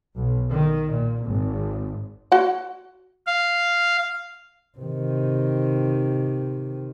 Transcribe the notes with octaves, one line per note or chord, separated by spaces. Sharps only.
B1
D#3
A#2
G#1
F#4 F#5
F5
C3 D#3